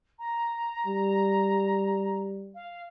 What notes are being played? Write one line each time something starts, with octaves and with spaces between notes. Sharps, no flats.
A#5
G3
F5